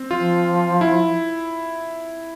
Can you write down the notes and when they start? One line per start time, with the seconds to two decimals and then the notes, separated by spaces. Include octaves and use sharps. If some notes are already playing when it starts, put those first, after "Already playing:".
Already playing: C4
0.10 F3 F4
0.81 E4